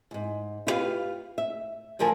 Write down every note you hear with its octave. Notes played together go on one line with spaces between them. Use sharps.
E2 G#2
E4 F4 G4 A#4 B4 F5
E5
D2 D3 F3 A#4 G#5 A5